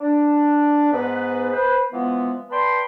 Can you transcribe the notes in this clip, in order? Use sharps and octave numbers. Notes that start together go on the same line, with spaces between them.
D4
G#2 B3 B4
B4 C5
E3 F3 G#3 B3
B4 D5 G5 A5 B5 C6